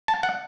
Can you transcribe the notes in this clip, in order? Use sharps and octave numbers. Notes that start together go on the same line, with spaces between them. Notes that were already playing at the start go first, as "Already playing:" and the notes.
A5
F#5